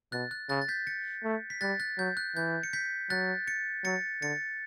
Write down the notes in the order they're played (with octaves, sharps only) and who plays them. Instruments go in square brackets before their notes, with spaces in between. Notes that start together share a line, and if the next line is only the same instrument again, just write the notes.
[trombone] B2 [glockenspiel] F#6 A6
[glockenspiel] F#6
[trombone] C#3 [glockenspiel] F#6 A6
[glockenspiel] A6
G6 B6
A6 C#7
[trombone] A3
[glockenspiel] B6
[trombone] G3 [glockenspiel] F#6 A6
[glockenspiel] F#6 A6
[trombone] F#3 [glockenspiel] G6
[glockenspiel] F#6
[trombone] E3 [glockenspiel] G6
[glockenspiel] C#7
G6 B6
[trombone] F#3 [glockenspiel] F#6 A6
[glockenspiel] A6 C#7
[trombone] F#3 [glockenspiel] A6 C#7
[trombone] D3 [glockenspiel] A6 C#7